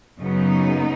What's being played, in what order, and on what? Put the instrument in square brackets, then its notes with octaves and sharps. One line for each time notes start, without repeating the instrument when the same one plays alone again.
[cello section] F#2 C#3 F#3 B3 D#4